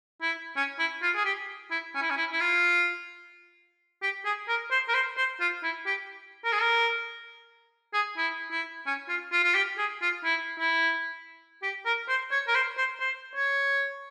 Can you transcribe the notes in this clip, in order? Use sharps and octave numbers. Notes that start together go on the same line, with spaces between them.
E4
C#4
E4
F4
G#4
G4
E4
C#4
E4
C#4
E4
E4
F4
G4
G#4
A#4
C5
A#4
C5
C5
F4
E4
G4
A#4
G#4
A#4
G#4
E4
E4
C#4
F4
F4
F4
G4
G#4
F4
E4
E4
G4
A#4
C5
C#5
A#4
C5
C5
C5
C#5